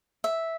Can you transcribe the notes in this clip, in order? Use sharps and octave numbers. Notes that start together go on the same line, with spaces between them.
E5